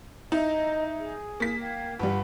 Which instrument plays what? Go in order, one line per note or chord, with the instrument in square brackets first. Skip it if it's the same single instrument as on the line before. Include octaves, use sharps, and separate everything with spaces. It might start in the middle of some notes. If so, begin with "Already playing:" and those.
[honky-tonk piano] D#4 E4 [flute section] D#5 A#5
[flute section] G#4
[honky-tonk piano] A#3 B6
[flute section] F5 G5 G#6
[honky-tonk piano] G1 G3 [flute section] F#5 B5